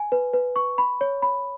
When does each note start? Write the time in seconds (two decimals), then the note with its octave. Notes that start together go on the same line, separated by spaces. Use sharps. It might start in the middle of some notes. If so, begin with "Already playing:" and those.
Already playing: G#5
0.12 B4
0.33 B4
0.56 C#6
0.78 B5
1.01 C#5
1.22 B5